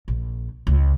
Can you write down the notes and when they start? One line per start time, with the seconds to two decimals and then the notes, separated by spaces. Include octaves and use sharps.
0.08 A#1
0.67 C#2